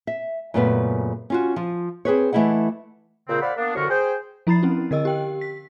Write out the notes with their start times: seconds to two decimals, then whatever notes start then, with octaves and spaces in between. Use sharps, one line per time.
0.07 E5
0.54 F#2 A#2 C#3 A3 B3 B4
1.30 C#4 F4 F#4
1.56 F3 F4
2.05 C4 G#4 B4 C#5
2.32 E3 A3 C#4 E4 D#5 F#5
3.29 A#2 C#3 C4
3.42 C5 D5 F5 F#5 B5
3.57 A#3 B3 D4
3.75 C2 F#2 D3 F#4 A#4 C#6
3.90 G#4 C5 G5
4.47 F3 E4 A#5 B5 A6 C7
4.63 C4 C#4 E4
4.91 D3 A#4 D#5 E6
5.05 G4 G5
5.41 B6